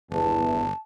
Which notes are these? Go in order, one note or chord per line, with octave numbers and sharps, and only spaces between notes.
G1 E2 A5